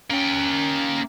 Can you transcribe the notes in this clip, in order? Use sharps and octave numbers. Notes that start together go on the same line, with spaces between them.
A#3 C#4 G5